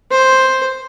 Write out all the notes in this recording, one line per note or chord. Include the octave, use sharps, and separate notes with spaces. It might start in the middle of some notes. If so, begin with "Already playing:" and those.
C5